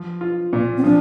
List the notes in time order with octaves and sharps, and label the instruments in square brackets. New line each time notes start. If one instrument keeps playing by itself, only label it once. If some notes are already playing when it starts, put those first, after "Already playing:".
Already playing: [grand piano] F3
F4
A#2
[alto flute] C4
[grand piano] F3 [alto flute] D4